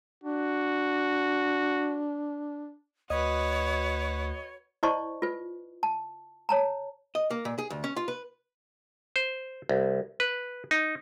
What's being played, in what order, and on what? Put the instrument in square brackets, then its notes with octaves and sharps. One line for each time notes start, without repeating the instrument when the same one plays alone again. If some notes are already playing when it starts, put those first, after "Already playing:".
[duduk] D4 [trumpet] F#4
[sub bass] D2 [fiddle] F#4 B4 [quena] C#5 [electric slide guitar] D#5
[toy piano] E4 C5 D5 D#5 A5 C#6
F4 B4
A5
C#5 A5 A#5
[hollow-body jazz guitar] D#5
A#3
A#2
G#4
D2
C#4
F4
B4
[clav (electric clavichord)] C5
C2
B4
D#4